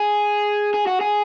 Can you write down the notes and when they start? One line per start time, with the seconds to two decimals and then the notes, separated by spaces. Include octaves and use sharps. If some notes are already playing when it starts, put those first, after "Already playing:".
Already playing: G#4
0.74 G#4
0.87 F#4
1.00 G#4